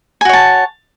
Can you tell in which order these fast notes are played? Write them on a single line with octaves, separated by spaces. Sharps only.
G#5 F#4 C#5 A5